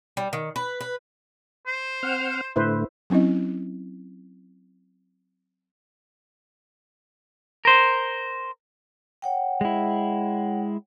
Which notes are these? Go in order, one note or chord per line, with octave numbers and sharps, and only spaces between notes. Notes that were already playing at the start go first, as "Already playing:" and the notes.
G3
D#3
B4
B4
C5
C4 F#5 F6
A2 D3 A3 E4 B4 C5
F#3 C4 C#4 E4 D#5
A#4 C5
C#5 F#5 G5
G#3 E4